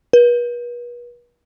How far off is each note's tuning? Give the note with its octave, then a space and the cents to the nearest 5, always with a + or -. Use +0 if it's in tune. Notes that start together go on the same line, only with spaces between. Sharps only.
B4 -40